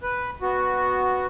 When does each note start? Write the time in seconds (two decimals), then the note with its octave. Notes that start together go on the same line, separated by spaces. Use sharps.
0.03 B4
0.42 B3 F#4